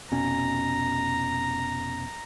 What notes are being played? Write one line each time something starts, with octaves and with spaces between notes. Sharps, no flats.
F1 B2 C#4 A#5